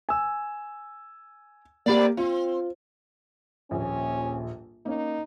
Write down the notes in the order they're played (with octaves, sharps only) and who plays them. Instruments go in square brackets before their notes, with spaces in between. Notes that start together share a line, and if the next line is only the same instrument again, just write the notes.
[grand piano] G#5 E6
[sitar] C3 A3 D5 [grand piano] A#3 G4
[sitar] C4 [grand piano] F4
[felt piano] D#1 A#1 [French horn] C#4
[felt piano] A#3 C#4 [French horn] D#4